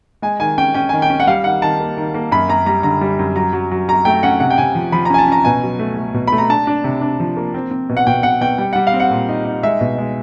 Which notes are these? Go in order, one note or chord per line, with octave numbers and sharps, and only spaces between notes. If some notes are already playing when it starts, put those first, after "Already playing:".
G#3 G#5
D#3 G#5
C#4 G5
C#4 G5
D#3 G#5
G5
C#4
F#5
G3 F5
D#3 F#5
D#3 A5
A#3
D#3
A#3
F#2 B5
F#2 A#5
G3 A#5
D3 A#5
G3
F#2
F#3 A#5
F#3
F#3
F#3 A#5
A3 G5
C#4 F#5
C3 F#5
G5
C3 G#5
F3
F3 B5
A#5
C#4 G#5
A5
C#4 A#5
B2 G#5
F#3
A3
A3
B2
A3 B5
A#5
D4 A5
D4
C3
D4
F3
A#3
C4
C4
B2
F#5
B2 G5
B2 F#5
B2 G5
G3 G5
G3 F#5
F5
C4
F#5
A#2
D#4
D#4
G#3 E5
B2
G#3